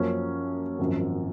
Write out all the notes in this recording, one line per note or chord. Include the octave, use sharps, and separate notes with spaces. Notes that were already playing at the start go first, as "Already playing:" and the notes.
Already playing: F#2 F3 A#3 C#4
G#1 F#2 F3